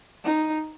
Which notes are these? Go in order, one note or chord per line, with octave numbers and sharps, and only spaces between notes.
D#4